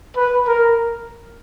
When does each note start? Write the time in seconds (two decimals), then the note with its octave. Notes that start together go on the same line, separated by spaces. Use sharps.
0.16 B4
0.46 A#4